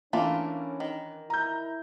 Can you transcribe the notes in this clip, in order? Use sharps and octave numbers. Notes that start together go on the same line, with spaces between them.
E3 A3 A#3 C#4 D4 F4
D#3
E4 A#5 G6